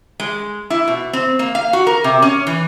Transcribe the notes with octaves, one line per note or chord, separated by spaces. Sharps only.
G#3
E4
B2
C4
A#3
F5
F#4
A#4
C3
C#4
E3